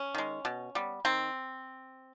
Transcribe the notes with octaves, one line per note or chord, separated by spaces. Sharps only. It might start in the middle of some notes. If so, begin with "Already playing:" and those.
Already playing: C#4
D#3 G#3
B2
G3 B3
D#3 C4